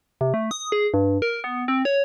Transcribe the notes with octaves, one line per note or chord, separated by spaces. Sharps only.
C3
A3
D#6
G#4
G2
A#4
B3
C4
C#5